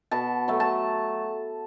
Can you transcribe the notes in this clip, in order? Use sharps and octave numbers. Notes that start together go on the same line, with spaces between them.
B2 A5
F#3 A3
A5